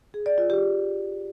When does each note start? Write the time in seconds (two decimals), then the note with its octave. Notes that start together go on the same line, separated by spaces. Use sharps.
0.14 G#4
0.26 D5
0.38 F4
0.50 G4